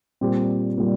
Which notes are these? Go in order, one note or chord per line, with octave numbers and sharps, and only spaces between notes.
A#2 G3 C4 G4
A#2 G3